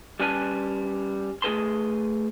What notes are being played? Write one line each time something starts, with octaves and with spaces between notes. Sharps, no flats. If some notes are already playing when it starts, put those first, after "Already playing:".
G3 C#4 B4 G#5 A5
A3 G#4 A#4 B4 A5 C6